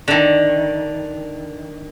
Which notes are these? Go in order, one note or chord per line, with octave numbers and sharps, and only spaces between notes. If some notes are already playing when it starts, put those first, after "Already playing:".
D3 D#3